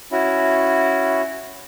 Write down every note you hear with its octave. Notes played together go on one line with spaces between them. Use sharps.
C#4 E4 F#4